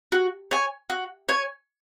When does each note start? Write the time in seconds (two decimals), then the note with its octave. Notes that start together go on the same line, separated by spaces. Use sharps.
0.12 F#4
0.51 C#5 G#5
0.90 F#4
1.29 C#5 G#5